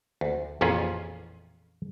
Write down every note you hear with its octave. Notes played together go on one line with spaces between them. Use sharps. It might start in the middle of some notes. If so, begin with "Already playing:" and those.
D2
A1 F2 A#2 C#4 F4 G#4